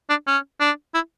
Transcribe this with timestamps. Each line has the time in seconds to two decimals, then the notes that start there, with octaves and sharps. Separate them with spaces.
0.10 D4
0.27 C#4
0.60 D4
0.94 E4